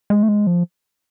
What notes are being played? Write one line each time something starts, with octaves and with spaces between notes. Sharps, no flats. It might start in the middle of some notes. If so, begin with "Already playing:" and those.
G#3
A3
G#3
F3